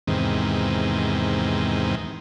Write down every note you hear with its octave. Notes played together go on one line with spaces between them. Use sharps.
E2 G#2 C3 D#3